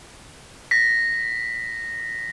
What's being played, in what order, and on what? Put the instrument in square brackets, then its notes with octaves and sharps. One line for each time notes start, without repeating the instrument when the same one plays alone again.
[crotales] A#6 B6